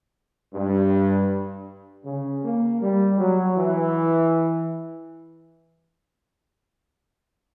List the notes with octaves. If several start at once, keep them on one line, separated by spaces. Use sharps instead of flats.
G2
C#3
A#3
G3
F#3
E3